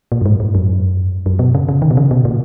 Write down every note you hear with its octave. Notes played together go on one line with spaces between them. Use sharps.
A#2
F#2
G#2
G#2
F#2
F#2
B2
C#3
C#3
D#3
B2
C#3
B2
A#2